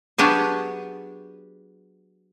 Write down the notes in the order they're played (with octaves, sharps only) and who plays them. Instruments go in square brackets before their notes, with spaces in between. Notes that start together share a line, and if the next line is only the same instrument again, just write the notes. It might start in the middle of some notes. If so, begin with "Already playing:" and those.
[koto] F#3 B3 D4 G4 G#4